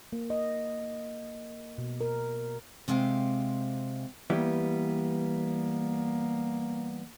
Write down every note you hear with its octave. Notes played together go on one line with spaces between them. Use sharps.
A#3
D#5
B2
A#4
C3 G#3 C4 F5 G5
E3 G3 A#3 B3